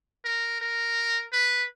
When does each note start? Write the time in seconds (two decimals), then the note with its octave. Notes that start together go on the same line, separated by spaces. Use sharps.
0.25 A#4
0.61 A#4
1.32 B4